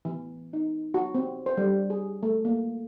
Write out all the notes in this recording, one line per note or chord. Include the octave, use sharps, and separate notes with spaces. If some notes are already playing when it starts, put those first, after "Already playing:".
E3
D#4
F#4
C4
C5
G3
G#4
A3
A#3